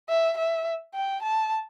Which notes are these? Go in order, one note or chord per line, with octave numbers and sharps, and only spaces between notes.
E5
E5
G5
A5